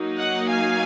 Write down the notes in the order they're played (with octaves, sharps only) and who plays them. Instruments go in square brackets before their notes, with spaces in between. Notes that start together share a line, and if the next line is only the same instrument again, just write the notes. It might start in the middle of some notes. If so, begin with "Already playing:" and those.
Already playing: [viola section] F#3 A#3 D#4
D#5 F#5
F5 G#5